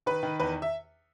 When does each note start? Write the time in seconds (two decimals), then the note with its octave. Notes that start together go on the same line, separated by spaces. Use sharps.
0.06 D#3 B4
0.23 D#3
0.40 E2 B4
0.62 E5